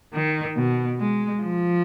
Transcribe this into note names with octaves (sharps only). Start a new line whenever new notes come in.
D#3
B2
G#3
F3